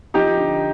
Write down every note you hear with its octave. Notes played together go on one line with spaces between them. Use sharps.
F3 D#4 G4
D3